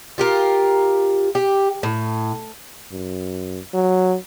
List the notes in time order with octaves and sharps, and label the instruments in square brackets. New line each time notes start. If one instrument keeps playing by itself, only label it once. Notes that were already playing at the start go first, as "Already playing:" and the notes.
[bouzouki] F4 G4 A#4
G4
A2
[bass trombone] F#2
F#3